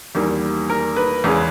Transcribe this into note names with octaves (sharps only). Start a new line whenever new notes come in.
E2 D#3 G3 A#3
A#4
B4
E2 C#3 G#3